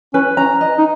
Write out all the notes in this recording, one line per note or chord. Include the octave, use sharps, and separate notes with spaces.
C#4 B4
C#4 A#5
D#5
D#4